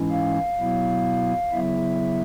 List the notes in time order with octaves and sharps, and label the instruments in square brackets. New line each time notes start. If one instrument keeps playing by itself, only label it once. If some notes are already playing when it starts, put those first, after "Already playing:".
Already playing: [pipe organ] G#2 E3 G#3 C#4 E4
F5
B2 F#3 B3 E4
C#3 F#3 B3 E4 E5